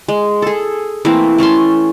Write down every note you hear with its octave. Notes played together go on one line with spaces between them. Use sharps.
G#3
G#4 A4
E3 A3 A#3 C4
A3 C#4 A5 C6